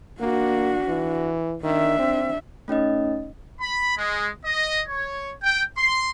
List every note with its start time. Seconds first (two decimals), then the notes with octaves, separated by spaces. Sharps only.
0.21 A#3 D4 F#4
0.88 E3
1.63 D#3 D4 E5
1.99 C4
2.68 A3 C#4 D#4 D#5
3.61 B5
3.98 G#3
4.44 D#5
4.89 C#5
5.43 G5
5.77 C6